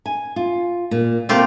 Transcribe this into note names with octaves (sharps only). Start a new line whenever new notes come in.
G#5
F4
A#2
C3 A3 A#3 C4 F4 G4